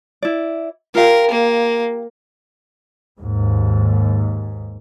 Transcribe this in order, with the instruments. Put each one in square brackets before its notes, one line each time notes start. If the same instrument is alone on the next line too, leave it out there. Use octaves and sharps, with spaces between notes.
[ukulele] E4 D5
[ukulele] F4 G4 F5 [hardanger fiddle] A#4
[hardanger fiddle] A#3
[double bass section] D#2 G#2